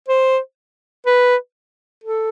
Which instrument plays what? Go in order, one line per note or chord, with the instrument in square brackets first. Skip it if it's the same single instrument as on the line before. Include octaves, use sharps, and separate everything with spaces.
[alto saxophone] C5
B4
A4